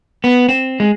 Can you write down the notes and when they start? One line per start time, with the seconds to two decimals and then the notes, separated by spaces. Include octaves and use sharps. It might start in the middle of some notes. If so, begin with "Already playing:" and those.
0.24 B3
0.49 C4
0.80 G#3